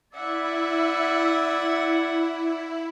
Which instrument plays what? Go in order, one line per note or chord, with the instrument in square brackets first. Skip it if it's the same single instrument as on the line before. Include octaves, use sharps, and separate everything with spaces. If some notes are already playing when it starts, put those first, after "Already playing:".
[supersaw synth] E4 [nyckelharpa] D5 G#5 [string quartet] E5 [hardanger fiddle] F#5